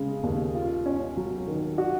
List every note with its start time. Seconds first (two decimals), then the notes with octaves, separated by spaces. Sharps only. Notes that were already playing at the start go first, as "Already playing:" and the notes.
Already playing: C#3 G#3
0.23 D#2
0.55 F4
0.86 C#4
1.17 F#3
1.47 D#3
1.78 F#4